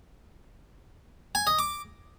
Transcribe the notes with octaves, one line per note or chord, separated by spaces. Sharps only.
G#5
D#5
D6